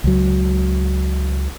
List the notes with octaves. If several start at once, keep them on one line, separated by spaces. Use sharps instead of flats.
C#2 F#3